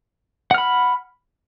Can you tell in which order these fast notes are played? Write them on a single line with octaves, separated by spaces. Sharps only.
F#5 F6 B5